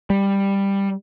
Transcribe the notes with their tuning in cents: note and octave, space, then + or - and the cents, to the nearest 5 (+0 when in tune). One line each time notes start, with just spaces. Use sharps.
G3 +10